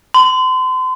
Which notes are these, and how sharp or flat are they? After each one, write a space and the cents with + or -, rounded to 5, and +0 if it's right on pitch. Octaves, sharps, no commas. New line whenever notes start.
C6 -35